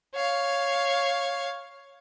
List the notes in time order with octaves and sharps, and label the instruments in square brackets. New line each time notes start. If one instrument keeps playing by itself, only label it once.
[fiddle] C#5 F5